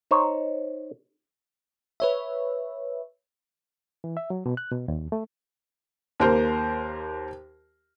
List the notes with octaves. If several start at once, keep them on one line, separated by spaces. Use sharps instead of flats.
D#4 C5 C#5
B4 C#5 E5
E3
E5
F#3
B2
F#6
B2
D#2
A3
D#2 A#3 A#4 C5